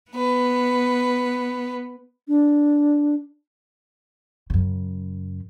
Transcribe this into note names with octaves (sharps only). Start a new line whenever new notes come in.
B3 B4
D4
F#2 C#3